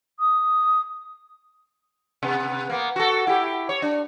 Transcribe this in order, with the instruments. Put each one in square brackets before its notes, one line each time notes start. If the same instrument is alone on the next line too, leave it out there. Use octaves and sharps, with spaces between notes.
[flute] D#6
[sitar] C3 B3
A#3 B3
F#4 A4
E4 G4
C#5
D4